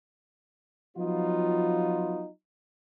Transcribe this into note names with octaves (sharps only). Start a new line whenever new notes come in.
F3 F#3 B3 D#4 F4